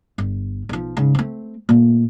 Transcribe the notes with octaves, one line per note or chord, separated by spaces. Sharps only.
G1
B1 F3
G#2 C#3
A3 C4
A#2 A3